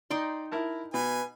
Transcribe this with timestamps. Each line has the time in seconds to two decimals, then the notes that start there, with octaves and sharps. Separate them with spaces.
0.10 D#4 D5 G5 C6
0.52 E4 A#4 A5
0.94 B2 B4 G#5